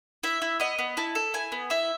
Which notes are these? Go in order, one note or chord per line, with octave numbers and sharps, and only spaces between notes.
E4 E5
E4
B3 D#5
B3
E4 A5
A4
E4 G#5
B3
E4 E5